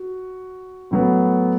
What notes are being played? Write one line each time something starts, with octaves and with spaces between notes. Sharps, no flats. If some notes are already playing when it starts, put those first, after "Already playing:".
Already playing: F#4
A2 F#3 B3